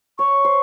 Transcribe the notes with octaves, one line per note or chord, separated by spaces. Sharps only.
C#5 C#6
C5